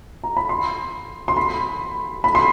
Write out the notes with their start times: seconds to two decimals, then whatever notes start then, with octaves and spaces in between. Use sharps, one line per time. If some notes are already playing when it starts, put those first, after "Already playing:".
0.24 A#5
0.37 B5
0.49 C6
1.28 C6
1.37 B5
2.24 B5
2.35 C6